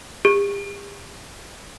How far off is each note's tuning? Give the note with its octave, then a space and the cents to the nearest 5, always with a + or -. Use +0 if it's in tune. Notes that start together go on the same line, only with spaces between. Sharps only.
G4 +40